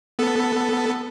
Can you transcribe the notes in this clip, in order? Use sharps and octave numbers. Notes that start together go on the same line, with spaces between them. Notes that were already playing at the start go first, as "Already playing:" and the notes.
B3 A4